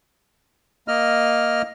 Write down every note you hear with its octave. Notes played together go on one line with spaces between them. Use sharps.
A#3 D#5 F6